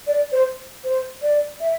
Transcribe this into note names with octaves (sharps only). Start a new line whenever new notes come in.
D5
C5
C5
D5
E5